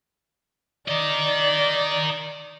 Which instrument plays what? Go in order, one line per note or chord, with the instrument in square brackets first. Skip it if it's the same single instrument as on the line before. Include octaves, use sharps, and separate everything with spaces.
[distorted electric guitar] A#4 D#5 [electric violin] D5